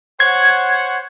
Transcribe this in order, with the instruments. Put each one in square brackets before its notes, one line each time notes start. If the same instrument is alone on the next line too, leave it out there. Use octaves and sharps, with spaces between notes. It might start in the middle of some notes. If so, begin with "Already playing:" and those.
[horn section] C5 C#5 F#5 [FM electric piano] G#6